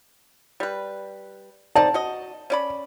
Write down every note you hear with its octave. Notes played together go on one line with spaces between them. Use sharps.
G3 B4
C4 D#4 D5 A5
F#4 D#5
C#4 D5 B5